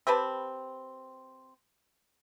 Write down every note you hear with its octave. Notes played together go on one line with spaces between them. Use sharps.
C4 G4 B4 A5